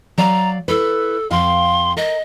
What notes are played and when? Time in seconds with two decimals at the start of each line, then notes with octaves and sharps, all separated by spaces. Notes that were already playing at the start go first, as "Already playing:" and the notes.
0.18 F#3 D5 F5 A#5
0.68 E4 A4 B4
1.31 F2 F5 G5 C6
1.97 A#4 D#5